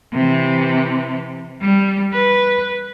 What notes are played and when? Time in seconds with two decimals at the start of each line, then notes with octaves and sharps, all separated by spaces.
0.13 C3 E3
1.61 G3
2.13 B4